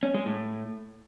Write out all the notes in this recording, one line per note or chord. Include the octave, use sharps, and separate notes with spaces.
C#4
G#3
A2